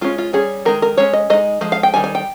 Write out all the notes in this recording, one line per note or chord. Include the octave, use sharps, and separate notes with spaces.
G#3 C#4 F4
F4
G3 C#4 G#4
D#3 G#3 D#4 A#4
A#4
G#3 C#4 C#5
D#5
G#3 D#4 D#5
F3 G#3
F5
G5
D#3 G3 G#5
G#5
G5